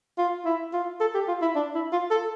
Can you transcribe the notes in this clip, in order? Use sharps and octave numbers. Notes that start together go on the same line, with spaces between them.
F4
E4
F4
A4
G4
F4
E4
D4
E4
F4
A4